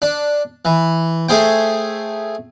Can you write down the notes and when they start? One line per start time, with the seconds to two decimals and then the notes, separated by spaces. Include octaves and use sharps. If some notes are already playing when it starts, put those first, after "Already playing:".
0.02 D4
0.65 E3
1.29 A3 G#4 C5 G5